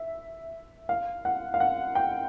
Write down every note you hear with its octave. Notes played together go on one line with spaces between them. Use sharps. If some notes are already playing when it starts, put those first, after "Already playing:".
Already playing: E5
F5
F#5
F5
F#5
G5